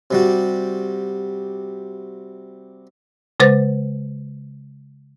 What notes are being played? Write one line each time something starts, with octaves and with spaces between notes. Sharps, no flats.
C3 G3 F#4
C#3 G#3 B4 C5 A6